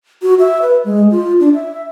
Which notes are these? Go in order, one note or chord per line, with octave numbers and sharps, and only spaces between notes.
F#4
E5
B4
G#3
F4
D4
E5